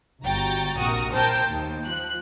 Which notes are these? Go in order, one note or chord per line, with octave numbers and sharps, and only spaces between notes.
G1 F#4 G5 A#5 A6
A#1 C3 F#4 A#4 D#6
A#4 C5 G5 A5 G6
D#2
F3 F#6